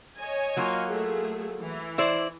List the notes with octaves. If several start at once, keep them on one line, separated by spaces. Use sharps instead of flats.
C#5 D#5 G#5
F#3 A#3 F4
A3 G#4
E3
E4 C5 D5